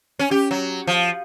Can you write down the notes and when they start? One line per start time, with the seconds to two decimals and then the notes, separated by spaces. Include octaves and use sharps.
0.19 C#4
0.31 G4
0.51 F#3
0.87 F3